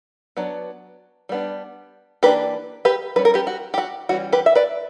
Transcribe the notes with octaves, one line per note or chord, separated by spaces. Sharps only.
F#3 B3 D4
G3 B3 D4
E3 A#3 D4 G4 B4
G4 B4
G3 C#4 B4
A#4
G4 B4
F#4
G4
F#4
E3 G3 C#4 F#4
G4 B4
E5
B4 D5